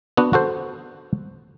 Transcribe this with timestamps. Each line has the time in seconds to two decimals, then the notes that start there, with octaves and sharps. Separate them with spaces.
0.17 B3 D4 F#4
0.33 F#4 A4 C5